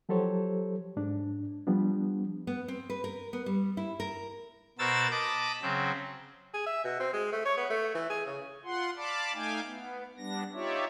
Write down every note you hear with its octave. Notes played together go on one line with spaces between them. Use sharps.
F3 F#3 G4 A4 C5 C#5
G#2 D4
F3 G3 B3 D4
B3
C4
B4
A#4
B3
G3
E4
A#4
B2 F#4 A#4 C5 E6 A6
D#5 A5 B5 D6
C#3 F#3 C4
G#4
E5
B2
C4
G#3
A3
C#5
B3
A3
E3
G#4
C#3
F4 F#5 C6
D5 F5 A5 B5 D6
A3 D#4 F5 G5 G#5 D6
B3
G3 B3 D4 A#6
D#4 F4 G4 C#5 D5 E5